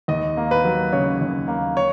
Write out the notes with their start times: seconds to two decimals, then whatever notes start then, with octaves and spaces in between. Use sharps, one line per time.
0.08 D#2 D#5
0.37 A#3
0.51 B4
0.64 F#3
0.93 C#3 C#5
1.21 D#2
1.48 A#3
1.77 C#5